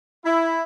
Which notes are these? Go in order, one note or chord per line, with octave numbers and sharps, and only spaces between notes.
E4